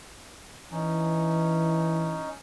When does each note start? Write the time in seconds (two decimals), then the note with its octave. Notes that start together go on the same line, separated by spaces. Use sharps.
0.72 E3 C#4 D#4